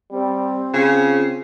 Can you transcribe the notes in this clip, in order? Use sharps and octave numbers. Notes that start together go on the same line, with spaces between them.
G3 C4
C#3 F4